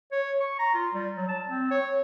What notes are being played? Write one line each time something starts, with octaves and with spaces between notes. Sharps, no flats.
C#5
C#6
A#5
F4
G3
F#3
A5
C4
C#5